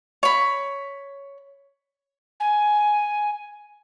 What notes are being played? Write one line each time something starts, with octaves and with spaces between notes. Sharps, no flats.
C#5 B5
G#5